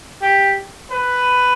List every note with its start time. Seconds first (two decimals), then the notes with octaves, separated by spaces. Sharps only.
0.22 G4
0.91 B4